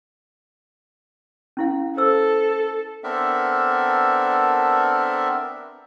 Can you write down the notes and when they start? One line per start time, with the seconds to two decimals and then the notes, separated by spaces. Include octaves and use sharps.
1.57 C#4 E4 F5
1.97 A4 C5 E6
3.04 B3 C4 D4 A4 A#4 E5